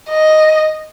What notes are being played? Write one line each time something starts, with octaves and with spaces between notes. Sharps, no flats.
D#5